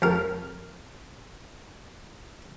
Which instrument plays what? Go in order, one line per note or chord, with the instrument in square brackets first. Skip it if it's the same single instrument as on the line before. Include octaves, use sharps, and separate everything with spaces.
[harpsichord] F2 A#4